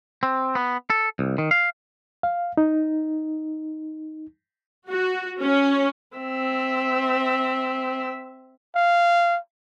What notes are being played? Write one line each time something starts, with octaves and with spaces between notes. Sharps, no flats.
C4
B3
A4
C2
D#3
F5
F5
D#4
F#4
C#4
C4 E5
F5